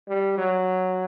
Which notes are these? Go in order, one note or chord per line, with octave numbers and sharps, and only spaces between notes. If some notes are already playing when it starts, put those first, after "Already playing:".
G3
F#3